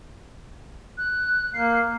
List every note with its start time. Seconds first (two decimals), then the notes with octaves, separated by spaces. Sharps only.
0.98 F#6
1.54 A#3 C7